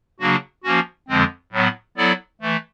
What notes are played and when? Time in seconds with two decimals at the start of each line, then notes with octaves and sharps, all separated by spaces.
0.20 C#3 F#3 A#3 D4 F#4
0.64 F3 A#3 C#4 F#4
1.08 F2 D3 F3 G#3 C4
1.52 A2 F#3 B3
1.97 F#3 B3 E4 A4 D5
2.41 E3 A3